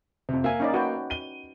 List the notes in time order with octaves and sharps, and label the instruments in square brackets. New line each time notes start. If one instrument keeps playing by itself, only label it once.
[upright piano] F2 C3
[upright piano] A#3 [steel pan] E5 G#5
[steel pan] C#4 D#4 D5
F#4 B4 G5
[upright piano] D#7 G7